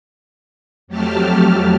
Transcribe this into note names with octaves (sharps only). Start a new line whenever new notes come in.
F2 F#3 A3 G4 A5 F6